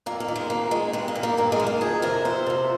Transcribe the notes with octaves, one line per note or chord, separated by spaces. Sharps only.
F2 A#3
A#3
D#3
G#3
F2 A#3
D#3 G#3
G2 G#3
A#3
D#3
A#3
G2 A#3
G#3
D#3
A#3
F2 G#4
C3 F3 A#4
F2 C5
C3 F3